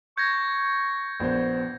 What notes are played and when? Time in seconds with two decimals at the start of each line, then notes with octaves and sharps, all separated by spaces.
0.18 C#6 G6 G#6 A#6
1.20 A#1 B3 C5